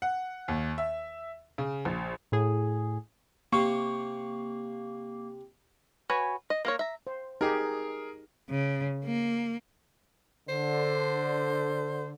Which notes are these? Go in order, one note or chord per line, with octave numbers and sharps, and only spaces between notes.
F#5
D#2
E5
C#3
A#1
A2 G#4
C3 A#3 C4 G4 C#6
F#4 B4 C#5 G#5
D#5
A#3 A#4 C#5
E5 A#5
C5
D#4 G4 G#4 A#4
C#3
A#3
D3 C5